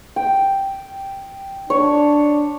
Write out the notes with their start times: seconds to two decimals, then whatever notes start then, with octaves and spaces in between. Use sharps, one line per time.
0.16 G5
1.70 D4 C#5